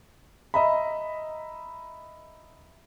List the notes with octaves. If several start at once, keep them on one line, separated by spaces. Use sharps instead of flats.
D#5 E5 A#5 B5